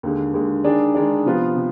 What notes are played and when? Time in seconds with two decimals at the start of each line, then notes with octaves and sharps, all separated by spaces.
0.03 D#2 D3 G#3
0.34 D#2 D3 G#3
0.64 D#3 G#3 D4 G#4 D5
0.94 D#3 G#3 D4 G#4 D5
1.26 C3 F3 B3 F4 B4
1.56 C3